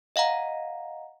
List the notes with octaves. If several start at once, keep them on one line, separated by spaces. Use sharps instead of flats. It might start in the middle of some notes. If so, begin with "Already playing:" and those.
D#5 F5 F#5 A#5